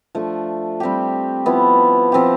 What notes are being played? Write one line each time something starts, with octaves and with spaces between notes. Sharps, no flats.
F3 A3 D4
G3 C4 G4
F3 B3 E4
F3 C4 G4